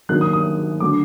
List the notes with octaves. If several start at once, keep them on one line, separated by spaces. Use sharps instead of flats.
D#3 F#3 A#3 D#4 F#6
D#6
D#6
D3 F#3 A3 D6